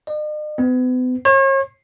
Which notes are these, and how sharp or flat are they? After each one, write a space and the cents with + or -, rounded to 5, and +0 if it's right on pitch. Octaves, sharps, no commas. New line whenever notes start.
D#5 -45
B3 +40
C#5 -40